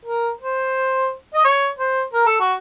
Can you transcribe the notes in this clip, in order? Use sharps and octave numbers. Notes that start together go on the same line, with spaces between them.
A#4
C5
D#5
C#5
C5
A#4
A4
F#4